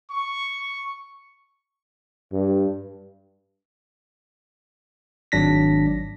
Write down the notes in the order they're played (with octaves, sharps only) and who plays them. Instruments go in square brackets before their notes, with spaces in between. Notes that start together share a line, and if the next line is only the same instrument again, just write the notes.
[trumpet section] C#6
[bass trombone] G2
[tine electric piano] G#1 F#3 D4 A#6 B6